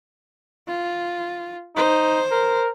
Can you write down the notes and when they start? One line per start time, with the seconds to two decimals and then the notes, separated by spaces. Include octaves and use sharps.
0.68 F4
1.76 D#4 C5
2.31 A#4